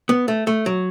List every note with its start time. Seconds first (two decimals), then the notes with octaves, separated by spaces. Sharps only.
0.09 B3
0.28 A3
0.47 A3
0.66 F#3